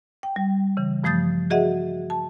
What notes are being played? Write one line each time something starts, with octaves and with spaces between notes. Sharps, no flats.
G5
G3
C#3 E3
G2 F3 A3 D#6 G6 A6
F#4 G#4 D#5 E5 F#5
A5